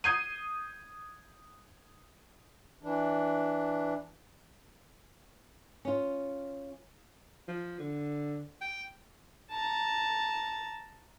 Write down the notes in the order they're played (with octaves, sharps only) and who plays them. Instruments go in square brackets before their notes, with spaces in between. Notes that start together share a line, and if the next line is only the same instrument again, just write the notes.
[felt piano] D#6 G6 G#6 C7 D#7
[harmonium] E3 D4
[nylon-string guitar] C#4 F4
[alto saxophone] F3
D3
G5
[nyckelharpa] A5 A#5